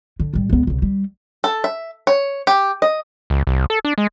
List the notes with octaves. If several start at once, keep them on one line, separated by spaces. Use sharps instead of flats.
D3
A1 G3
C#2 B3
C2 C#3
G3
A4
E5
C#5
G4
D#5
C#2
C2
A4
D4
G#3